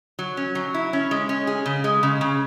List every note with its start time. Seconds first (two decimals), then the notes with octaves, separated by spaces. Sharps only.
0.19 F#3
0.37 C#4
0.55 F#3
0.74 E4
0.93 C#4
1.11 G#3
1.29 C#4
1.47 G#4
1.66 C#3
1.84 G#3
2.03 C#3
2.21 C#3